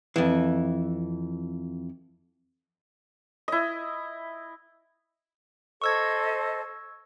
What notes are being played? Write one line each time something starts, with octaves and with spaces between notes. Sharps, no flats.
F2 E3
E4 D#5
A4 C5 D#5 C#6 E6 G#6